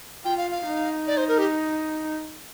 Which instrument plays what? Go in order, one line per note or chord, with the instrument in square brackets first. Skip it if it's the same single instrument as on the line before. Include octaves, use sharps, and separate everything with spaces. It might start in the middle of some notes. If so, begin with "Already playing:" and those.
[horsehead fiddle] F4 [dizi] G5
[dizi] F5
F5
[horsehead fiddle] D#4
[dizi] D5
C5
A#4
G4